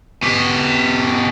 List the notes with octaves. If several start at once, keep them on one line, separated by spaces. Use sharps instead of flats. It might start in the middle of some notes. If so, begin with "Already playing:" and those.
B2 G4